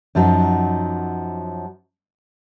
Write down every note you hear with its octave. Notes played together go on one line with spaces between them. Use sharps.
F#2 F3 F#3 D#4